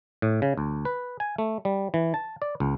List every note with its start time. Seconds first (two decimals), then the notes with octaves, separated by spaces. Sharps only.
0.22 A2
0.42 C#3
0.57 D2
0.85 B4
1.20 G#5
1.38 A3
1.65 G3
1.94 E3
2.14 A5
2.42 D5
2.60 C#2